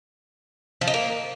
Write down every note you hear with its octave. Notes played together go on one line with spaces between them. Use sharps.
F3
D#4
A#3